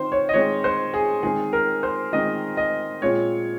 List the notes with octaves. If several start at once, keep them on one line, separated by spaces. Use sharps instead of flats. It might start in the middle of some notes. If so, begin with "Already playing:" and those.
Already playing: D#3 C4 C5
C#5
D#5
D#3 G#3 C4 C#5
C5
G#4
D#3 G#3 C4 G#4
A#4
C5
D#3 G#3 C4 D#5
D#5
A#2 G#3 C4 C#5